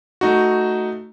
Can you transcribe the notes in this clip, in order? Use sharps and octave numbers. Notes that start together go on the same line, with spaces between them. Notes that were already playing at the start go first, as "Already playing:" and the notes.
A3 D#4 F#4